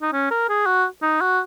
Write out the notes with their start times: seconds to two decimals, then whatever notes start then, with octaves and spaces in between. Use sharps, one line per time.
0.02 D#4
0.13 C#4
0.31 A#4
0.49 G#4
0.66 F#4
1.02 D#4
1.21 F#4